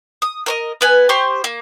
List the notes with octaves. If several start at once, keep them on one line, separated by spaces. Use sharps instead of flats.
D#6
A#4 C#5 D#5
B3 B4 G#5
G4 C5 C6 C#6
A#3